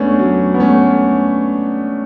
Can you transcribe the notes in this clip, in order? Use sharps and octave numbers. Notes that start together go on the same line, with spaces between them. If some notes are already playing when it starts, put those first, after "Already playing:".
Already playing: A3 B3 C#4 D4
F#3
B3
A3 C#4